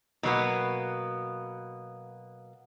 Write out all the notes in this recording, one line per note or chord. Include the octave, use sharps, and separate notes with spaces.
B2 F#3 A#3 B3